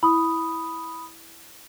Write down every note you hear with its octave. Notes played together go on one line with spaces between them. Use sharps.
E4 B5 D#6